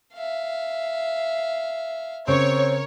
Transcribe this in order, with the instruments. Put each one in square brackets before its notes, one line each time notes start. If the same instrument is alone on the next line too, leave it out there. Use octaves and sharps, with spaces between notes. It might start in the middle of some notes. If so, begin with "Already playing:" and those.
[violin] E5 F5
[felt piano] C#3 [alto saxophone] C4 [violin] A#4 [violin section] C#5